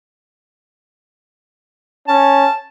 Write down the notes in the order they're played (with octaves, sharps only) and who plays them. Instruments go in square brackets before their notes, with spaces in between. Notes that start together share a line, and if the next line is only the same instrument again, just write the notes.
[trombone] C#4 [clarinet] A5